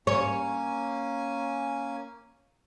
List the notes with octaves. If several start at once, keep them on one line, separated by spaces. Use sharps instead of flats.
A#3 C#4 C#5 G#5